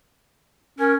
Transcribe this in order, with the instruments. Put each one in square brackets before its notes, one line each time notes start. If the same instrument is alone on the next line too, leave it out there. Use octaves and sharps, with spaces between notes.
[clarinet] C#4 [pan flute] A#4